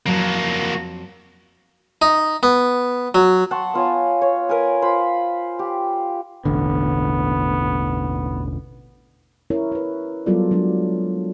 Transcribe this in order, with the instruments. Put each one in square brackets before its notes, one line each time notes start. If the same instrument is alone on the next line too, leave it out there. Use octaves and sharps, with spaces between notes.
[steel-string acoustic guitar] F2 F#3 A5 [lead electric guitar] A#3 F#4
[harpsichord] D#4
B3
F#3
[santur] F#5 A5 C6 C#6
B3 F4 C#5 G#5
C#5
A#4 B4 G#5
F4 C5 B5
G4
[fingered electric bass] E1 A1 D3 [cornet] B3
[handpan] C#4 E4 A#4 C#5
E4 B4
F#3 G3 B3 F4 A4 D5
F#3 G#3 D4